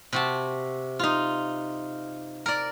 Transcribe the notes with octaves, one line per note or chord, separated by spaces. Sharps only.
C3 F#4 A5
D#4 F4
A#4 D5